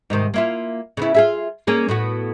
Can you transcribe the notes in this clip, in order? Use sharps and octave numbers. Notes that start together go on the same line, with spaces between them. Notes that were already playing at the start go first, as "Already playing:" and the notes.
G#2 C3 D#3
A#3 E4 F4
C#3 B3 E4
F4 G#4 E5
A#3 C#4 G#4
A2 B3 F#4